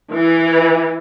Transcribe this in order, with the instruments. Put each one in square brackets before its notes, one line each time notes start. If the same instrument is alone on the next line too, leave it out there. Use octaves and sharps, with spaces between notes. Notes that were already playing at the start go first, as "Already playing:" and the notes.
[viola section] E3